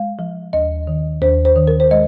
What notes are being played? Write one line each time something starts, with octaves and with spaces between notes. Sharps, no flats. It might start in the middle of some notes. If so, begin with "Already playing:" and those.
Already playing: G#3 F5
F3
D#2 D#5
D#3
D#2 C5
C5
D#3
A#4
C5
G#3 D#5